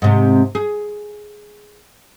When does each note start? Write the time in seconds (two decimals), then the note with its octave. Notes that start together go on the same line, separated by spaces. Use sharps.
0.02 G#2 C3
0.55 G#4